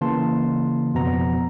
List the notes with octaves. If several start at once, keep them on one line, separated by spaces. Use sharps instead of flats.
C#3 E3 A#3 A5 C6
F2 B2 F3 B3 A#5